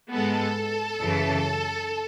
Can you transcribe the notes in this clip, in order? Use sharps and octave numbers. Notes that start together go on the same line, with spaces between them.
G#2 G#3 B3 A4
F#2 C#3 E3